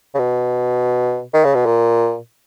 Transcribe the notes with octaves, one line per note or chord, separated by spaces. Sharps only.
C#3
B2
D#3
C#3
B2
A#2